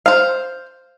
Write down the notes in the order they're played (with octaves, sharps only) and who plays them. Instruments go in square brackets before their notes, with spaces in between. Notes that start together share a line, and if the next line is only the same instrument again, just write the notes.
[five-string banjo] C5 F5